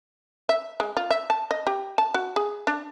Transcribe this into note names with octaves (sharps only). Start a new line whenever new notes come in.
E5
G#3
F4
E5
A5
D#5
G4
A5
F#4
G#4
D4